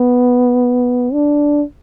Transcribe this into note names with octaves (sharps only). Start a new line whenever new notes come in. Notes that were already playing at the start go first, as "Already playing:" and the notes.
Already playing: B3
D4